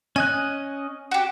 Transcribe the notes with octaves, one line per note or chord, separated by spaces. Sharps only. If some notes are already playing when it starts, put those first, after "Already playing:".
C#4 D#5 G#5 F#6
F#4 G4